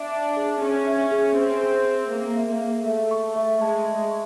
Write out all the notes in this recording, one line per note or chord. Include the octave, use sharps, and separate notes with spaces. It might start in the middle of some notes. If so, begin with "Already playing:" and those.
Already playing: D4 E5
E5
G#4
C#4 G#4
E5
G#4
C4 C5
G#4
G#4
A#3 G#4
E5
A#3
G#4
A3 E5
C#6
E5
G#3 A5
E5
C#6